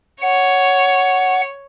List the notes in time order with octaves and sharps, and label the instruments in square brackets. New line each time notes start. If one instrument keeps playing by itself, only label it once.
[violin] C#5 [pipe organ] F#5